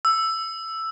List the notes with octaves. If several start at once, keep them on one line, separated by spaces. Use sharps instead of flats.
E6